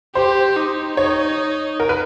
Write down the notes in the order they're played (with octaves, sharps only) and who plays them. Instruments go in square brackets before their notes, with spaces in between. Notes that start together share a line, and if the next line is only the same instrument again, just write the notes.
[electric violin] G4 [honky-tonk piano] C5
[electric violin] D#4
[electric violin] D#4 [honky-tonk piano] C#5
[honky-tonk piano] A#4
B4